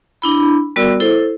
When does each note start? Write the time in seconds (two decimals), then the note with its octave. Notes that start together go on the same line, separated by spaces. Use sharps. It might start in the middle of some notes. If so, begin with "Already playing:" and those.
0.22 D4 E4 B5
0.76 G3 B3 F#4 A#4 D5 E6
1.00 E4 A4 C5